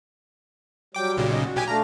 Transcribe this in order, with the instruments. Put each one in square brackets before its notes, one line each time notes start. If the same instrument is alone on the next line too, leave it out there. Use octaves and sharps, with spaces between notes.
[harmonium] F#3 G3 [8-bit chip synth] G5 D6
[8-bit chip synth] B1 A#2 C#3
[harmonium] E2 D#5
F#4
[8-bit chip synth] B1 G4 G#5
[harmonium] A3 D4 F5 [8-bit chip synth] A#5